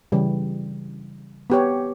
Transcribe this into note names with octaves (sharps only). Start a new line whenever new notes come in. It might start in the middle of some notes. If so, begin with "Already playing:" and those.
C#3 E3 G3
B3 G4 C#5